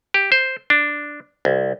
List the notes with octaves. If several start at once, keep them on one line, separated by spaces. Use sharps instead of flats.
G4
C5
D4
C2